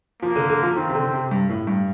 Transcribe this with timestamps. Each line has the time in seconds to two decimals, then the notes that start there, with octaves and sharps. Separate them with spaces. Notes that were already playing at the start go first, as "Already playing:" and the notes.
0.22 F3 A#3
0.36 D3
0.50 D3
0.63 F3
0.76 D#3 C4
0.89 C3
0.95 D3
1.13 C3
1.31 G2
1.49 A2
1.67 G2